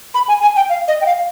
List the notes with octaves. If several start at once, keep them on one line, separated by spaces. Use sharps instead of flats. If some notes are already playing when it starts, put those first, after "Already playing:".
B5
G#5
G#5
G5
F5
D#5
G5
F5